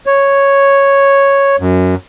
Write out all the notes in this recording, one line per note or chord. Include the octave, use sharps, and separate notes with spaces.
C#5
F#2